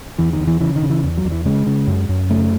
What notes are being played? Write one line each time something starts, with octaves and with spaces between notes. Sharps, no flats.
E2 E3
D#3
E2
E3
C#3 E3
D#3
C#3
E3
E2
F#3
E2
E3
C#3 G#3
C#3
F#2
F#2
C#3 A3